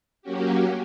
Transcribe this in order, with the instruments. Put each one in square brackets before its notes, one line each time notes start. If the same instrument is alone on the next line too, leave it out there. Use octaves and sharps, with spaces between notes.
[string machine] F#3 A#3 C#4 F#4 G4